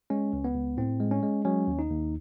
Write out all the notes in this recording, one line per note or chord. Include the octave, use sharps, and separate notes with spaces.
G#3 C#4
C#2
B3
C#2
A2 C4
G#3
C#4
G#3
F#3 C#4
D#2
D#4
D#2